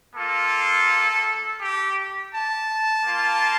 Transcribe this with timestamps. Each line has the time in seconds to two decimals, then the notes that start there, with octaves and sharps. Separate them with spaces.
0.15 A#3 F4 A4
1.61 G4
2.33 A5
3.05 A#3 F4